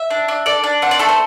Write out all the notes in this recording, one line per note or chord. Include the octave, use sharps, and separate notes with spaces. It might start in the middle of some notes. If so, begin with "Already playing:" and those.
Already playing: E5
D4
D4
A4 D5
D4
C4 F#5
D5
A3 A4
C5